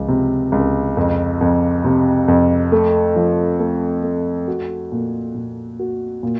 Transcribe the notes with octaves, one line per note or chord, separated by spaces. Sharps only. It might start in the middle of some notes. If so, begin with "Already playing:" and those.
Already playing: C#2 F3
C3
C#2
F2
F2
C3
F2
A3
F3
A3
A3
F#4
A#2
A#2
F#4
A#2